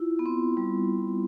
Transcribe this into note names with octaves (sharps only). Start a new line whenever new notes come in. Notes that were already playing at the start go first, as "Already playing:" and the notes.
Already playing: E4 F4
B3
C4
G3